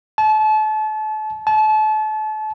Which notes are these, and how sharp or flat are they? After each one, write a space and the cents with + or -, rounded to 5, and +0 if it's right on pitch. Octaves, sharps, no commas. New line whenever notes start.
A5 -35
A5 -35